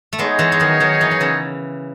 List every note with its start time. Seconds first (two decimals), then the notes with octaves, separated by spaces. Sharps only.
0.13 A3
0.19 G#3 B3 D#4 G#4 C#5
0.39 E3 G#3
0.52 G#3
0.60 D#3 F#3
0.80 D#3 F#3
1.01 E3
1.11 F#3
1.20 C#3 E3